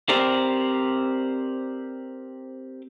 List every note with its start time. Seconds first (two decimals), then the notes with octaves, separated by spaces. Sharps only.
0.09 C4 G4 A#4 C5 D5